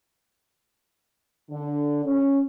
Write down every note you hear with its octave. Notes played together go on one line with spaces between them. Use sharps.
D3
C#4